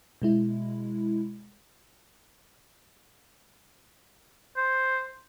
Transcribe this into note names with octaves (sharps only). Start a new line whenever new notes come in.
B2 G#3 E4
C5